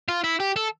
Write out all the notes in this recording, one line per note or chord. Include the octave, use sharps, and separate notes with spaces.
F4
E4
G4
A4